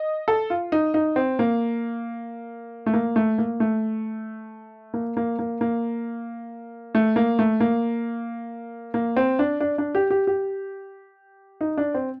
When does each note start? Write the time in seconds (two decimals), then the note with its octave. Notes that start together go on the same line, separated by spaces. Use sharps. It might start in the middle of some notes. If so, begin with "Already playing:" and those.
Already playing: D#5
0.28 A4
0.50 F4
0.72 D#4
0.94 D#4
1.16 C4
1.39 A#3
2.86 A3
2.93 A#3
3.16 A3
3.38 A#3
3.60 A3
4.94 A#3
5.17 A#3
5.39 A#3
5.61 A#3
6.95 A3
7.16 A#3
7.39 A3
7.60 A#3
8.94 A#3
9.17 C4
9.39 D4
9.60 D4
9.78 D4
9.95 G4
10.11 G4
10.27 G4
11.61 D#4
11.77 D4
11.94 C4